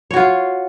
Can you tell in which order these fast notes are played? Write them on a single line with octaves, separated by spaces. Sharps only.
C#5 F#4 F4